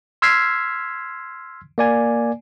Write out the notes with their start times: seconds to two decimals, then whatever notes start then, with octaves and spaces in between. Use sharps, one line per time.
0.22 C6 E6 F6 G#6 B6 C7
1.78 A#3 D5 G#5